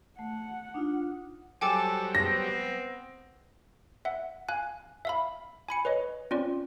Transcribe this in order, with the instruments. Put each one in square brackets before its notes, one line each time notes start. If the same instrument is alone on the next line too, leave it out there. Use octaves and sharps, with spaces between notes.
[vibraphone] A3 [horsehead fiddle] F#5
[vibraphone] D4 D#4 F4
[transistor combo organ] F#3 G3 [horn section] A4 C5 [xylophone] G5 G#5 D6
[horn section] B3 C4 [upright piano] A#6
[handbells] E5 F#5
F5 G#5 F#6
E5 F5 B5
G#5 B5 C#7
B4 C#5 D#5
C4 C#4 F4 D5